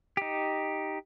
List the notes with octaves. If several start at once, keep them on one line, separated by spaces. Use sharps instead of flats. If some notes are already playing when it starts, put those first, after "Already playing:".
D#4 G4